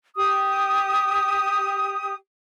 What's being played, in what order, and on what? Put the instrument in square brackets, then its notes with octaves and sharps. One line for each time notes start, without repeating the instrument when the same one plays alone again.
[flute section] G4 D#6